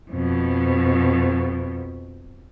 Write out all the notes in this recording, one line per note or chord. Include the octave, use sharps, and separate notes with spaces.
F2 B2